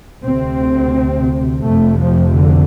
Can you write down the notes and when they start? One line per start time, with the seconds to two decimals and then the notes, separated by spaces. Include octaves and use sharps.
0.23 D2 C3 C4
1.62 F1 F2 C3 A3
1.98 F3
2.33 D3